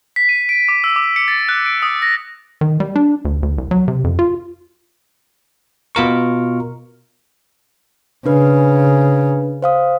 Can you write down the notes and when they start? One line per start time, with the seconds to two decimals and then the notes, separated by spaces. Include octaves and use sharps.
0.16 B6
0.29 D#7
0.49 D7
0.68 D6
0.84 E6
0.96 D6
1.16 C#7
1.28 A6
1.49 F#6
1.66 D7
1.82 D#6
2.02 A#6
2.61 D#3
2.80 G3
2.96 D4
3.25 D2
3.43 D2
3.58 C2
3.71 F#3
3.88 C3
4.04 F2
4.19 F4
5.95 B2 F4 A#4 C#6
8.26 C#3 D4 B4
9.62 C5 F5 D#6